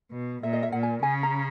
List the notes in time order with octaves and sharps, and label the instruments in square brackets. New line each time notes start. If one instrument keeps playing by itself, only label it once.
[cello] B2
[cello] A#2 [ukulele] E5
[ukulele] D#5
E5
[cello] A#2 [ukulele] F#5
[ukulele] G#5
[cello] C#3 [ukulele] G#5
[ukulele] A#5